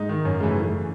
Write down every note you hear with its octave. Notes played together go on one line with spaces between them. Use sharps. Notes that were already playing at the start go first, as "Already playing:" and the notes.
Already playing: G#2 D#4
D#3
F#2 C#4
C#3 E3 A3